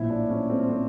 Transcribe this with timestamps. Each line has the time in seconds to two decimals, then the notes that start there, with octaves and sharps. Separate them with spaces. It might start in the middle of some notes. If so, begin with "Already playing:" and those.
Already playing: A#1 A2 F3 E4
0.10 D4
0.30 C#4
0.50 C4
0.60 C#4
0.70 C4